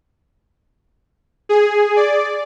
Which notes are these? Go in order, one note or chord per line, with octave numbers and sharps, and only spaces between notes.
G#4
D5